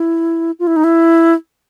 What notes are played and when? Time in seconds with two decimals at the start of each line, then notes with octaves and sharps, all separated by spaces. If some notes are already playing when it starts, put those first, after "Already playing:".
Already playing: E4
0.59 F4
0.67 E4
0.76 D#4
0.84 E4